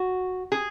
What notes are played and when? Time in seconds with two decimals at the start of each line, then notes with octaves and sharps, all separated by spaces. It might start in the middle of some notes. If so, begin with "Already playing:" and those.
Already playing: F#4
0.52 G#4